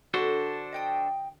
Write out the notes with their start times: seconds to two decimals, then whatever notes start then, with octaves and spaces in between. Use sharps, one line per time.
0.14 D3 D4 F#4 A4 C5
0.73 D#5 G5 D#6